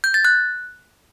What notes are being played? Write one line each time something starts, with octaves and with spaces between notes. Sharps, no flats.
G6
A6
F#6